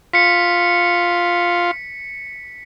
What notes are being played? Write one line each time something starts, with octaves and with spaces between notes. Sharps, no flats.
F4 B6 C#7